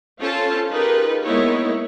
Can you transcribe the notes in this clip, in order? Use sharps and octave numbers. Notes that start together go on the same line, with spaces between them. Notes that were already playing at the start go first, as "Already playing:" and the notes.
C#4 F4 A4 C5 F5 A5
D#4 F4 G4 G#4 A#4 B4
G#3 A#3 B3 D#4 E4 C#5